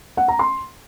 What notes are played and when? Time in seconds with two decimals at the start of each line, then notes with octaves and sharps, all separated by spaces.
0.17 F#5
0.28 A#5
0.39 C6